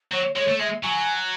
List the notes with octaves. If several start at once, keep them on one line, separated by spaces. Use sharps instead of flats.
F#3 C#5
G#3 C#5
A3
G#3 E5
F#3 G#5